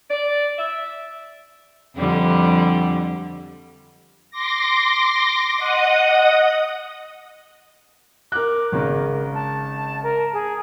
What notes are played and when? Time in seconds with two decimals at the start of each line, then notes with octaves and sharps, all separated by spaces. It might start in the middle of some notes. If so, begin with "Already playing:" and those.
0.10 D5
0.58 E5
1.96 F2 D3 G3
4.30 C6 D6 A#6
5.57 D#5 F#5 D#6
8.32 A#4 D6 F#6
8.72 G#1 C#3 A#4
9.35 A5
10.03 A#4
10.33 G#4